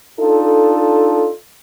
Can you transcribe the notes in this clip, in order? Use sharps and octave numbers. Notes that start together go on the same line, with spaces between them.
D4 D#4 F4 A4